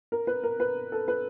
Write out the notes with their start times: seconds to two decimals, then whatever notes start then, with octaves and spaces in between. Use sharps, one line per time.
0.12 A#4
0.27 B4
0.44 A#4
0.60 B4
0.92 A4
1.08 B4